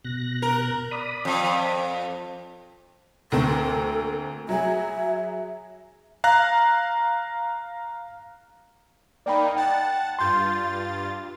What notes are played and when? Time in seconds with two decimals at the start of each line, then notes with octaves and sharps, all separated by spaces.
0.04 B2 F#6 A#6
0.42 A#4
0.91 D5 B5 D#6
1.25 F2
3.32 D2 A#3 C4 A4
4.49 F#3 G#4 E5
6.24 F5 A#5 F#6 A#6
9.26 A#3 D#4 D5 G5 B5
9.56 F#5 G5 A5 A6
10.19 G2 F4 C6 G6 A6